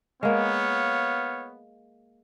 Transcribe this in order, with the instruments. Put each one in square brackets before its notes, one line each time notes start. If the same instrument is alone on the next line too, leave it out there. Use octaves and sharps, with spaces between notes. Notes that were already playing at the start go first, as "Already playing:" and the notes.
[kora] G#3 A#3 [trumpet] B3 [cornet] C#5 [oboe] F5